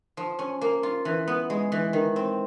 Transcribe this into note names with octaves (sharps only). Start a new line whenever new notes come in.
F3
C#4
A#3
F4
E3
B3
G#3
E3
D#3
C4